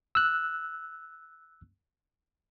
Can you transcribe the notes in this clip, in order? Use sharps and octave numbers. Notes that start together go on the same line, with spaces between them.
E6 F#6